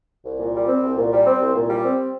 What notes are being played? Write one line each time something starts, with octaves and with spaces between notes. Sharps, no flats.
C2
A#2
G3
C4
C2
A#2
G3
C4
C2
A#2
G3
C4